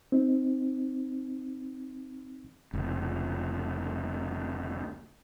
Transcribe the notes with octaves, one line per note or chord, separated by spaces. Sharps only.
C4 D#4
F1 C#2